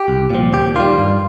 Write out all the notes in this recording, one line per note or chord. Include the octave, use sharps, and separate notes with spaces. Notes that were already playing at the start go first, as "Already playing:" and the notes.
Already playing: G4
C2
A#2 F3
D#2 G4
D#3 G3 F4
G2